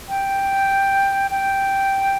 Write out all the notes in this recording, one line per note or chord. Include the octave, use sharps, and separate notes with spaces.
G5
G5